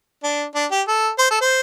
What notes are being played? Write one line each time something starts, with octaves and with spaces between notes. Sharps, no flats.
D4
D4
G4
A4
C5
A4
C5